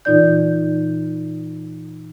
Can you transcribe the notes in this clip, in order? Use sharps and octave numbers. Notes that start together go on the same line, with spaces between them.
A#2 E3 D#4 F4 D5 G6